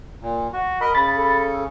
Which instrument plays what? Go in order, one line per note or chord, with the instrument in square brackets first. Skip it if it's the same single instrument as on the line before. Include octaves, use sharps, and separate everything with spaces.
[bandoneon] A#2
F#4
[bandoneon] A#4 D#5 [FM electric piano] B5
[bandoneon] C#3 [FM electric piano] B5 A6
[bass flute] A4